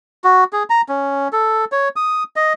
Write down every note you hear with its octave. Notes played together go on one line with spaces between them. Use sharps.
F#4
G#4
A#5
C#4
A4
C#5
D#6
D#5